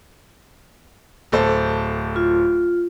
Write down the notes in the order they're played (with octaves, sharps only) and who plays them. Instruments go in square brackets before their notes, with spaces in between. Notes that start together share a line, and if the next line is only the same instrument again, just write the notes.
[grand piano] D1 A4 C5
[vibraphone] F4